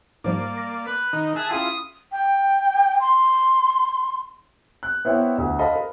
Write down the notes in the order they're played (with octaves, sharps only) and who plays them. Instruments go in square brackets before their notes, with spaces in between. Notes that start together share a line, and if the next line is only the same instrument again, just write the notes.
[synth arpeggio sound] G#2 F3 G3 [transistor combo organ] A#3 D5
[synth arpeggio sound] A#6
[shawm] B4
[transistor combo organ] D#3 D#4
[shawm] G#4 [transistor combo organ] E5 G#5 A5 [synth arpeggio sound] D#6 F#6
[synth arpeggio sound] C#4 G#4 G5 [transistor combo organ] E4 F4 [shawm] D#6
[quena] G5
C6
[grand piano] F#6
B3 E4 C5 C#5 E5 G5
D2
A4 C5 D#5 F5 A5 B5
A#4